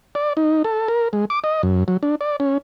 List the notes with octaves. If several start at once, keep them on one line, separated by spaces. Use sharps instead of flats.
D5
D#4
A4
A#4
G#3
D6
D#5
F#2
F#3
D4
D5
C#4